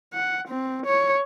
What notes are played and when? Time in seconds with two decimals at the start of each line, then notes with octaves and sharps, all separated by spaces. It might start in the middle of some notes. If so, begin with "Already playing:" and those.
0.14 F#5
0.48 C4
0.86 C#5